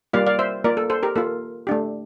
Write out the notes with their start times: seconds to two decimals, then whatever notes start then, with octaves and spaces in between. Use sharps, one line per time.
0.13 G3 A#3 F4 D5 F5
0.27 D5 F5
0.39 C5 E5
0.64 A#3 F4 A#4 D5
0.77 A4
0.90 A4 C5
1.03 G4 A#4
1.16 A#3 F4 A4
1.67 A3 D4 G4